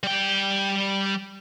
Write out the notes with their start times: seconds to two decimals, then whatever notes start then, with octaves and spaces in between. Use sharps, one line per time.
0.03 G3 G5